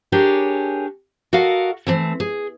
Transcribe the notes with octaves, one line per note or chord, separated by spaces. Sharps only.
D4 G4 G#4 A#4 C#5
F#4 A4 A#4 D#5 F5 F#5
E3 A3 C4
G#4